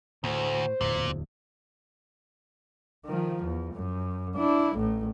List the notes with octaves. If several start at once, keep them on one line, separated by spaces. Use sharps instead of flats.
D2 A2 C5
D1 E2 A#2
D#3 F3
E2
F#2
D4 E4
A1 A2